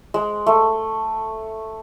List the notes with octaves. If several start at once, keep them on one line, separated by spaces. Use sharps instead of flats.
G#3
A3